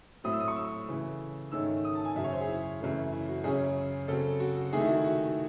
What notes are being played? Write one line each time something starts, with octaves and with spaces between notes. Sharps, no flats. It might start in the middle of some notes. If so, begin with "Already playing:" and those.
A2 F#3 A3 C4 D#6
E6
D#6
C#6
E6
C#3 E3 A3
G#2 D#3 A3 C#4 E6
D#6
A5
G#5
F#2 C#3 F#3 E5
C#5
C5
G#4
E4
F#2 C#3 E3 A3 E4
E4
F#4
F#2 C#3 F#3 C#4 G#4
C#3 F#3 C4 A4
F#4
F#4
C3 D#3 A3 G#4
E4
F#4
E4
F#4